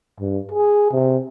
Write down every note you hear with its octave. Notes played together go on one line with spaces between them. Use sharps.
G2
G#4
C3